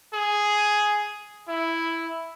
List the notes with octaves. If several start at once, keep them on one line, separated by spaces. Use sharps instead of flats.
G#4
E4